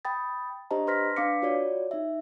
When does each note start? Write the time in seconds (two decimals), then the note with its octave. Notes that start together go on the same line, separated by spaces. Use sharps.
0.05 G5 B5 D#6 A6
0.71 D4 G4 C5 D#5 A5 A#5
0.87 B4 C6 F6 A#6 B6
1.16 D4 B4 F5 D6 B6 C#7
1.42 F4 F#4 C#5 D5
1.91 D#4 E5